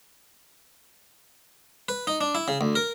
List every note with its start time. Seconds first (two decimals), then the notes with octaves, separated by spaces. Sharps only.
1.89 B4
2.07 D#4
2.21 D4
2.35 E4
2.48 C#3
2.61 D2
2.75 A#4